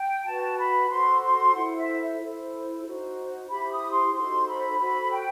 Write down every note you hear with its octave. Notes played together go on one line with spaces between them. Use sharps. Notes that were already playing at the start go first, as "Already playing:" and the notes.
Already playing: G5
F#4 B4 A5
B5
B5
F#4 A4 C5 C6
C6
E4 A4 C5 F#5
E5
E4 A4 C5
D#4 F#4 C5
E4 G4 C5 B5
D#6
C6
D#4 F#4 A4 C5 C6
B5
F#4 A4 C5 B5
G5